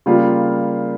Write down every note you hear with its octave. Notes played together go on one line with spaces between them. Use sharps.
C#3 G3 A#3 F4